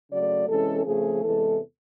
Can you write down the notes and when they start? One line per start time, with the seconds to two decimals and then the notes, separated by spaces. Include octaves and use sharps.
0.10 C#3 F#3 A3 D5
0.48 C3 E3 G#3 C#4 A4
0.85 F2 C#3 F3 A3 G#4
1.23 E2 C3 E3 G#3 A4